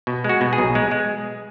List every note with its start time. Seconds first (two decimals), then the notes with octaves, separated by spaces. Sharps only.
0.07 B2
0.24 G#3 F#4
0.41 B2
0.53 G#4
0.58 B1
0.75 G#3
0.91 G#3